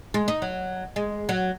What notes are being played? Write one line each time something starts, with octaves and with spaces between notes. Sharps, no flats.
G#3
D#4
F#3
G#3
F#3